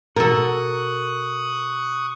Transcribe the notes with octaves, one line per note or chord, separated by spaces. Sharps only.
B2 A4 A#4 C#6 D#6 F#6